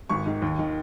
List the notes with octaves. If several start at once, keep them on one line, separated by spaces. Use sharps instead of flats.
G#1 C#6
G#2 D#3
D#2
D#3